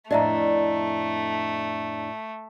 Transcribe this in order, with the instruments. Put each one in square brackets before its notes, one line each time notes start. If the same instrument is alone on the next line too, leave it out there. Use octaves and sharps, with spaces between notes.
[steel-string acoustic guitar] F2 A2 D4 [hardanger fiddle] A3 [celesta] D#5 E5 A#5